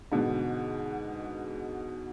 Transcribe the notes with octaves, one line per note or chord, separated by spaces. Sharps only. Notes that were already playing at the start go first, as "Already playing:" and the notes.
G#2 B2 D3